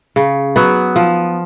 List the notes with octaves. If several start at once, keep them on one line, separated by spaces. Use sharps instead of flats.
C#3
F#3 B3
F3